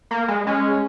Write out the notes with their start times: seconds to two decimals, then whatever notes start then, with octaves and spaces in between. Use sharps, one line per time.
0.11 A#3
0.28 G#3
0.46 G#3 C#4